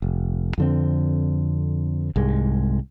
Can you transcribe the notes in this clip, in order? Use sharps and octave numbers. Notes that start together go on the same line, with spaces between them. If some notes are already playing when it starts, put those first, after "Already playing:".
F1
F2 D3 C4
C2 G#2 G#3